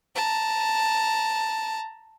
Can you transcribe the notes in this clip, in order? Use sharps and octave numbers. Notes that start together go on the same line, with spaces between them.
A5 A#5